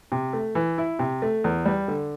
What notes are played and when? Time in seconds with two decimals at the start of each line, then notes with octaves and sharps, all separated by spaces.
0.12 C3
0.33 A3
0.55 E3
0.78 E4
0.99 C3
1.22 A3
1.44 E2
1.66 G3
1.88 D3